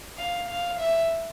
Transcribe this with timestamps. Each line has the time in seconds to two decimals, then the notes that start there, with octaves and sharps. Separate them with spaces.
0.18 F5
0.49 F5
0.79 E5